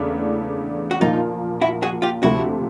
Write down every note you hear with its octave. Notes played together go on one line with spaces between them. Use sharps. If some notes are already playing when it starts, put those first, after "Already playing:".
Already playing: E2 C#3 E3 A3 D4
F#4
A#2 F3 A#3 D#4 F4
E4 F#4
F#4 G#4
F4 G4
D2 C3 F3 A3 E4 F#4